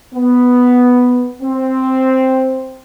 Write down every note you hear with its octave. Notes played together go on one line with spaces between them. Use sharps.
B3
C4